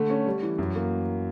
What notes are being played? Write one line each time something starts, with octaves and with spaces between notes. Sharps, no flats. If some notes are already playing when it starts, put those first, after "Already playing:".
Already playing: D3 A3
C#4
G3
E3
F#2
A#3